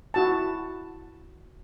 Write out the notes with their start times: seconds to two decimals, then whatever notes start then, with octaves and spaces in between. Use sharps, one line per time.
0.14 E4 F#4 A5